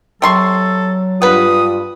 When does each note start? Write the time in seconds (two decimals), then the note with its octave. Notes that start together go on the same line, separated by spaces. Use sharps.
0.22 C3 F#3 A4 C6 C#6
1.22 G2 B3 F4 B4 D#6